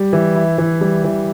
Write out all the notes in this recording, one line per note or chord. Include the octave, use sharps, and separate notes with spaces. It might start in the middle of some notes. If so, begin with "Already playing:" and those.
Already playing: G3
E3
E4
E3
G3
E3